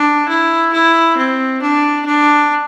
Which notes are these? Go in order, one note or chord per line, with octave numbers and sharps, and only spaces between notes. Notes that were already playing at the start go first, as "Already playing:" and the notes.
Already playing: D4
E4
E4
C4
D4
D4